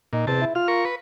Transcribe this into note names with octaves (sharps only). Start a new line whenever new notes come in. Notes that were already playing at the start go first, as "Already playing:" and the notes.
A#2 D#4
E2 C3 A5
E4
F4 F6
A#4 C#6
B4